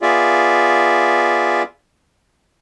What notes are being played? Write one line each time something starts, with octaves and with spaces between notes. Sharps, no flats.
B3 F4 G#4 D5 E5